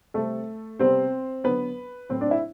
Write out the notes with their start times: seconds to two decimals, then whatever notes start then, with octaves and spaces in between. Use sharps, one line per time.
0.14 C3 G3 A3 C4 A4
0.79 C3 G3 B3 C4 C5
1.44 D3 F#3 B3 B4
2.09 A2 F#3 A3 C4 C5
2.21 D4 D5
2.31 E4 E5